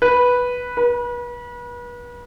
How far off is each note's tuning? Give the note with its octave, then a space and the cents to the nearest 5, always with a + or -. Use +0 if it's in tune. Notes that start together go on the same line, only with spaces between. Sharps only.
B4 -5
B4 -35